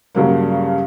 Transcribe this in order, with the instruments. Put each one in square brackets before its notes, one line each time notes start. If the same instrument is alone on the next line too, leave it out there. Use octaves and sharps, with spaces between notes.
[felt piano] G2 C#3 F#3 A#3